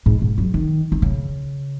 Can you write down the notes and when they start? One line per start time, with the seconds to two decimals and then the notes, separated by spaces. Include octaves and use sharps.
0.06 G#2
0.22 G#2
0.38 F#3
0.54 D#3
0.92 D#3
1.02 C#3